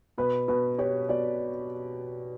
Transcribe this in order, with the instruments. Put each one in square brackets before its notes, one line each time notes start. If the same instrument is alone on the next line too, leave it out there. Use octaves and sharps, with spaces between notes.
[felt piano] B2 [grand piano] B4
[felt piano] B2 [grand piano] B4
[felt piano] G4 [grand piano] C#5
[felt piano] B2 [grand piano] D5